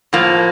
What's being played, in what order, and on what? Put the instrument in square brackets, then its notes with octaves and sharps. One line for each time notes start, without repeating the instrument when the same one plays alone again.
[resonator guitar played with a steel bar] A2 F3 A#3